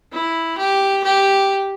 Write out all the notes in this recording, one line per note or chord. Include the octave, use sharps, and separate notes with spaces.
E4
G4
G4